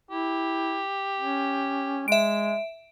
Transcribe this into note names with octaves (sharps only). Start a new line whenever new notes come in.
E4 G4
C#4
G#3 E5 D7